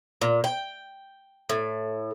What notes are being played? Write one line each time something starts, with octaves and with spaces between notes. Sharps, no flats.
A#2
G5
A2